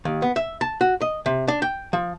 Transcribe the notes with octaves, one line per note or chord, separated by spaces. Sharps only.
D#2
B3
E5
A5
F#4
D#5
C3
D4
G5
F3